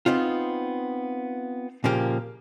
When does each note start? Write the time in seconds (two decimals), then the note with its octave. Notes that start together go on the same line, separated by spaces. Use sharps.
0.06 B3 C4 D#4 F4
1.84 A#2 C#3 F3 A#3 G4